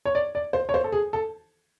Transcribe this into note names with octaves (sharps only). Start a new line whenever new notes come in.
C#5
D5
D5
C5
C#5
C5
A4
G#4
A4